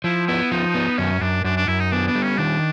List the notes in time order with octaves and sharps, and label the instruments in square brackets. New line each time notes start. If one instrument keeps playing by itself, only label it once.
[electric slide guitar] F3 [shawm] E4
[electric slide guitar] B3 [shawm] E4
[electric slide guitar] F3 [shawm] D#4
[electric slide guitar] B3
[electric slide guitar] F#2 [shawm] C#4
[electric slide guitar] F#2 [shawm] D4
[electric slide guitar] F#2 [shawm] D4
[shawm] D4
[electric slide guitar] F#2 [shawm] E4
[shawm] D#4
[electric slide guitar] B3 [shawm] D4
[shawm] D4
[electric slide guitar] G3
[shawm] C#4
[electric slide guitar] D#3 [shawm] D4